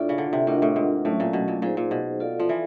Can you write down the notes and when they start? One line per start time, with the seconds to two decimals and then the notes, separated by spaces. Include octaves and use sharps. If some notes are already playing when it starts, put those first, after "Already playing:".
Already playing: A2 D4 F4 A4 D5
0.09 C#3
0.18 D3
0.33 C3
0.47 A2 D4 F4 A#4 D#5 F#5
0.62 A2
0.76 G#2
1.05 A2 F#3 A3 C#4
1.20 A#2
1.33 B2
1.48 A#2
1.62 A#2 D#4 G#4 C5
1.77 A#2
1.91 B2
2.20 F4 A4 D5 F5
2.40 F3
2.49 E3